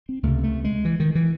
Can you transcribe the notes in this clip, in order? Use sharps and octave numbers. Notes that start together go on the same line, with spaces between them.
C4
C#2 C3 A3
A3
G#3
E3
D#3
E3